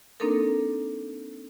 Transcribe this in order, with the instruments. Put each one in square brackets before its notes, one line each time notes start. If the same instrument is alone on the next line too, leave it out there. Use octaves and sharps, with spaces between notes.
[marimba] A#3 C4 D4 D#4 A4 A#4